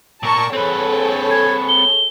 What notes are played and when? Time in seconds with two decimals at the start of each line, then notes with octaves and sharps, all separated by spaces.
0.23 A#2 A#4 A5 C#6
0.53 C4 G#4 A4 B4 C#5
1.31 G#6
1.69 G7